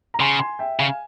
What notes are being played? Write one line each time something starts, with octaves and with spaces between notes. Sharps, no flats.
A#5
C#3 G#5 C6
G#5 C6
E5 G5
C#3 F5 G#5